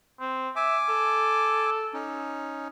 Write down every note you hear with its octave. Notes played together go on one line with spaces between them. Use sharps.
C4
E5 G#5 D6
A4
C#4 D#4